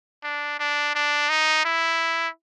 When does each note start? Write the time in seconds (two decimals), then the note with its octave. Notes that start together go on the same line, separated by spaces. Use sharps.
0.24 D4
0.60 D4
0.95 D4
1.30 D#4
1.65 E4